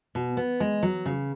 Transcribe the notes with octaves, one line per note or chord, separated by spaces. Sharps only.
B2
B3
G#3
F#3
C#3